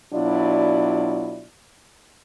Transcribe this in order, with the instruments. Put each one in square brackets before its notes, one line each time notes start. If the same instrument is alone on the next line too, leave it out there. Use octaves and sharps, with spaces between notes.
[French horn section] B2 F#3 D4 E4 F4 D5